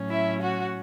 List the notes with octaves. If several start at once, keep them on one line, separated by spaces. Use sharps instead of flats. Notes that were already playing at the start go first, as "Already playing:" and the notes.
Already playing: A2 F#3 C#4
E4 E5
F#4 F#5